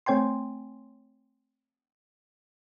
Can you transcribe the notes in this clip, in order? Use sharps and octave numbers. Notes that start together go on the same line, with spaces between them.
A3 C4 C#5 G5 G#5 C6